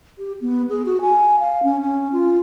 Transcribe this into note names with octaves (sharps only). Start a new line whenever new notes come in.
G4
B3
G#4
F#4
G#5
F5
C#4
C#4
F4